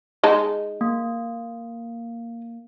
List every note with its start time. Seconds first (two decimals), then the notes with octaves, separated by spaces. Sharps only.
0.23 G#3 D#4 A5
0.81 A#3